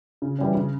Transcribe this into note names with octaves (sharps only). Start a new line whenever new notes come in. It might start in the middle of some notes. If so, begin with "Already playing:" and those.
C#3
E3 G3 C#4
C#3